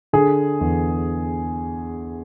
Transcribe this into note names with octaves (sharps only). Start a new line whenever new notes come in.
D3 G#4
E2